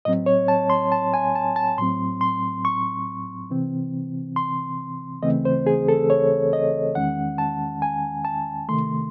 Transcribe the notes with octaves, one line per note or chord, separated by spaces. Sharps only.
A2 F#3 C4 D#5
C#5
A5
C6
A5
G#5
A5
A5
A2 F#3 C4 C6
C6
C#6
C3 E3 C4
C6
D#2 C#3 E3 A3 C4 D#5
C5
G#4
A4
C#5
D#5
E2 D#3 G#3 C#4 F#5
A5
G#5
A5
C3 D#3 A3 C6